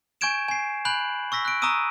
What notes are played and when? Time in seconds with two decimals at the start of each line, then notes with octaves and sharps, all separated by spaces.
0.21 G#5 C#6 G6 G#6 D7 E7
0.48 G#5 C7
0.85 G#5 B5 F#6 G6 F#7
1.32 C#6 E6 A#6 B6
1.45 F#6 D7
1.62 A#5 C#6 D#6 E6 D#7